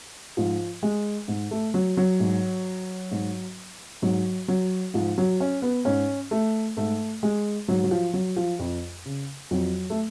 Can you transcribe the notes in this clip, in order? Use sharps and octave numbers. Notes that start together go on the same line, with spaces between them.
G#2 F3
G#3
G#2
A3
F#3
F#3
G#2
G#2
G#2 F#3
F#3
G#2 F3
F#3
C#4
B3
G#2 C#4
A3
G#2 A3
G#3
G#2 F#3
F#3
F3
F#3
F3
F2
C#3
F2 F#3
A3